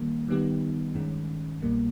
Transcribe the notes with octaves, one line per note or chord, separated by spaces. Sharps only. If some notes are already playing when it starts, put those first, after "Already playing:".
Already playing: D#3 G3 A#3
D#3 G3 B3 D#4 G4
G2 D#3 G#3 C#4
C2 B2 G3 A#3